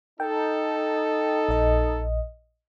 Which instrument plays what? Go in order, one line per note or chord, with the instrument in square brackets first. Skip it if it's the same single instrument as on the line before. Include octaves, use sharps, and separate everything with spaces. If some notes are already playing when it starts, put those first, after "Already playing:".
[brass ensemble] D#4 A4 [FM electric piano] G5
[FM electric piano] A#1 D#5